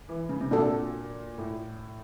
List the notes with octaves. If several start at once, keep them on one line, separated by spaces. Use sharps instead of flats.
E3
C#3
C3
A#2 D4 F#4 A4
A2